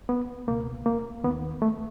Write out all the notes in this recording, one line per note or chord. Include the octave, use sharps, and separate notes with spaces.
B3
C#2 B2 A#3
A#3
D#2 D#3 B3
A3